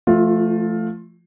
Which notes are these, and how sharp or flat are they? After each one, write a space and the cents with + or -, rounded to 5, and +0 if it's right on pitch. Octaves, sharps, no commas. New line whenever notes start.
F3 -30 A3 +0 F4 +15